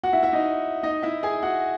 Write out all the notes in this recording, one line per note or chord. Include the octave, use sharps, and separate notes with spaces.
F#4 F#5
E4 E5
E4 E5
D#4 D#5
D#4 D#5
E4 E5
G#4 G#5
F#4 F#5